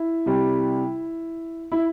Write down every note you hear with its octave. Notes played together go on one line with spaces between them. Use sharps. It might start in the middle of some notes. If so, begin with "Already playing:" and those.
Already playing: E4
C3 G3
E4